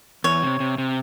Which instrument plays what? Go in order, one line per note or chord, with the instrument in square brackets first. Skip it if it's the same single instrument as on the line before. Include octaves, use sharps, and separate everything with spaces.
[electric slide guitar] E2 [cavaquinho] C#5
[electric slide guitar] C3
C3
C3